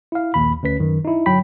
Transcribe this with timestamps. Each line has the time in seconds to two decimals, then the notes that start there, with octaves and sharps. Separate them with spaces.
0.12 E4 F5
0.34 A#1 D#2 B5
0.63 D2 C#4 B4 B6
0.80 F#2 D#3
1.05 D#4 E4
1.26 G1 F#3 G5 B5 B6